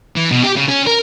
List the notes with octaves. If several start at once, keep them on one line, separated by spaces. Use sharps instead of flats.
E3
B2
G4
C#3
C#4
A#4